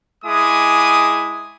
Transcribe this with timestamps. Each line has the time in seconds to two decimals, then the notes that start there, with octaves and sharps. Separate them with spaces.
0.24 G#3 E4 G#5 D6 D#6